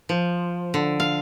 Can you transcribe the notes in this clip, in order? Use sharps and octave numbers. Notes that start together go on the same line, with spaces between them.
F3
D3
F5